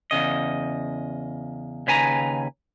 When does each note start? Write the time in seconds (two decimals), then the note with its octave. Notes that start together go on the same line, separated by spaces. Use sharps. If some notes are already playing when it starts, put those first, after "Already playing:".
0.11 E2 C#3 D#5
1.87 D#2 C#3 B4 G#5 A#5